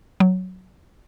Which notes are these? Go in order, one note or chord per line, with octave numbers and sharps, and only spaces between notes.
F#3